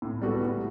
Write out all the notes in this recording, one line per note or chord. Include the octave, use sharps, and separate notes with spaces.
A2
G3 B3 F#4 A4
A2